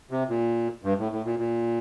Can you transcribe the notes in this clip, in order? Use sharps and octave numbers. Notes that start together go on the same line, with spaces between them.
C3
A#2
G2
A2
A2
A#2
A#2